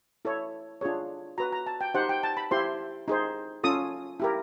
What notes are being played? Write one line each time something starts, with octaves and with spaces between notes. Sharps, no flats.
E4 A4 C#5
D4 F4 G#4 C#5
F#4 B4 A#5
A#5
A5
G5
D#4 G4 C5 F#5
G5
A5
B5
E4 G4 C5 C6
D#4 G#4 C5
C#4 F4 A4 D#6
E4 G4 A#4